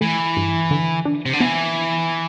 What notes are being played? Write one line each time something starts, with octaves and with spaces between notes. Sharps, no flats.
E3 A3
G2
D3
D4
C3
D3
E3 B3